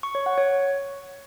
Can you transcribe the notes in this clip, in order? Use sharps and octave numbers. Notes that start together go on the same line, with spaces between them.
C#6
C#5
F#5
C#5